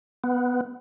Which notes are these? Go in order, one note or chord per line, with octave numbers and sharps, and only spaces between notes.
B3